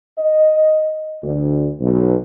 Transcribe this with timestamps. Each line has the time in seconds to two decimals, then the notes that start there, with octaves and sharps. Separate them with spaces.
0.18 D#5
1.23 D2
1.79 B1